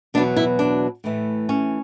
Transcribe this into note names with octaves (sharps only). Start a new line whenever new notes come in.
E2 B2 F#3 B3 D4
E4
D4
A2 E3 A3
C#4